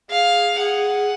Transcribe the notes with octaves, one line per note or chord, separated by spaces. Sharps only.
G#4 F5
G#4 F#5